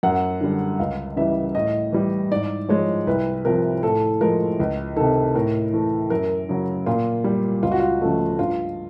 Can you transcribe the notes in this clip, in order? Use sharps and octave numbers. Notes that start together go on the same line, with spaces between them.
F#2 F#5
D3 G3
C#2 F5
C#3 E3 G3 E5
A2 D#5
E3 G3
G#2 D5
F3 G#3 C#5
C2 B4
C3 F3 A#4
A2 A4
F3 G#3 A#4
C#2
C3 D#3 A4
A2 A#4
E3 A3
F#2 A#4
C#3 F#3
A#2 F4
G3
C#2 F4
F#4
F4
C#3 F3 A3
G2 F4